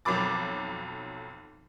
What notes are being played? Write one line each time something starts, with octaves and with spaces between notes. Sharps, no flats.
B1 F2 F#3 B5 D6 A6